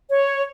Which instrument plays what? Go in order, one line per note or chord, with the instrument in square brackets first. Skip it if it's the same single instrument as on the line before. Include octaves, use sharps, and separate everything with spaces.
[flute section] C#5